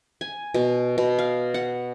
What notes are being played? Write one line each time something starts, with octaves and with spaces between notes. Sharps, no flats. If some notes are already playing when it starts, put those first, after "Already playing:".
G#5
B2
B2
F5
F#5